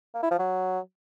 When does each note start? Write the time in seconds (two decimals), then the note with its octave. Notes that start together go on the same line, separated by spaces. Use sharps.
0.15 A#3
0.23 E4
0.31 F3
0.39 F#3